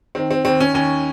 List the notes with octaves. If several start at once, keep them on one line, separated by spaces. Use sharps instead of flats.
D#3 C4
C4
D#2 C4
C#4
D#2 C#4